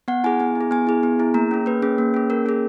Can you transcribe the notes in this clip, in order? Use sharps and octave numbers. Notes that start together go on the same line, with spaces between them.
B3 F#5
E4 G#4 G#5
B3 G#5
E4
G#4
B3 G#5
E4 G#4
B3
E4 G#4
A#3 A#5
C#4 G#4
A#3 B4
C#4 G#4
A#3
C#4 G#4
A#3 A#4
C#4 G#4